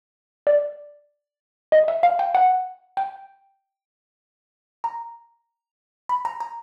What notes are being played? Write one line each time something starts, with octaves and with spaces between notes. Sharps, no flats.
D5
D#5
E5
F5
G5
F#5
G5
A#5
B5
A#5
A#5